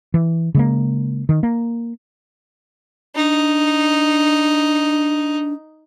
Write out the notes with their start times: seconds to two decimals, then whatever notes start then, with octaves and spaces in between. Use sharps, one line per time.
0.14 E3
0.55 C#3 G#3 A#3
1.29 D#3
1.43 A#3
3.16 D4 D#4